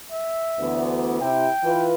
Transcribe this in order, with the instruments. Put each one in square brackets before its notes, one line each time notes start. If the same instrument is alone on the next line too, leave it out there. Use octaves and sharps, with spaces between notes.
[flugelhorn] E5
[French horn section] D2 E3 B3
[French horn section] C3 E4 [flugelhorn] G5
[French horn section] E3 F4 B4